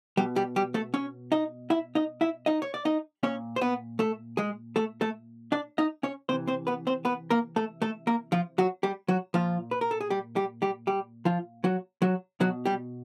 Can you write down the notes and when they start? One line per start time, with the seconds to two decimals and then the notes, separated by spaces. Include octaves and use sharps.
0.17 B2 G3 G4
0.36 G3 G4
0.56 G3 G4
0.74 A3 A4
0.94 C#4 C#5
1.32 D#4 D#5
1.70 E4 E5
1.95 D#4 D#5
2.21 E4 E5
2.46 D#4 D#5
2.62 C#5
2.74 D5
2.85 D#4 D#5
3.23 A#2 C#4 C#5
3.56 C5
3.61 B3 B4
3.99 A3 A4
4.37 G#3 G#4
4.76 A3 A4
5.01 A3 A4
5.52 D4 D5
5.78 D#4 D#5
6.03 C#4 C#5
6.29 C3 E3 C4 C5
6.47 C4 C5
6.67 B3 B4
6.87 C4 C5
7.05 B3 B4
7.30 A#3 A#4
7.56 A3 A4
7.82 A3 A4
8.07 A#3 A#4
8.32 F3 F4
8.58 F#3 F#4
8.83 G3 G4
9.08 F#3 F#4
9.34 A#2 F3 F4
9.71 B4
9.81 A#4
9.91 A4
10.01 G#4
10.10 G3 G4
10.36 G3 G4
10.62 G3 G4
10.87 G3 G4
11.25 F3 F4
11.64 F#3 F#4
12.02 F#3 F#4
12.40 B2 F#3 F#4
12.65 G3 G4